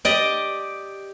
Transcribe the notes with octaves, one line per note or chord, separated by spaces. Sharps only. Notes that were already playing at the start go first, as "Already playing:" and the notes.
G4 D5 D#5